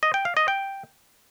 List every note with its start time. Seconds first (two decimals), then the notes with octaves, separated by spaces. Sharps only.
0.03 D#5
0.14 G5
0.25 F5
0.37 D#5
0.48 G5